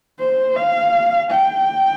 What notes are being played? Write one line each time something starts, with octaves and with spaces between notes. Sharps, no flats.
C5
F5
G5